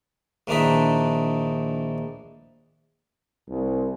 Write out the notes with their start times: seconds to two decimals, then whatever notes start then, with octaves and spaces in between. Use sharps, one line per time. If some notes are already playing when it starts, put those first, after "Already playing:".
0.47 A#1 D#3 E3 D4 D#4 B5
3.48 C2